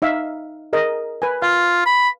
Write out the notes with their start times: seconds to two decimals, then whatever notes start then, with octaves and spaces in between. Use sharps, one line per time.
0.02 D#4 E5 F5
0.73 G#4 A#4 D#5
1.22 B4 G#5
1.42 F4 F5
1.86 B5